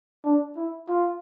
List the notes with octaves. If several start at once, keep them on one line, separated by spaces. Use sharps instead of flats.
D4
E4
F4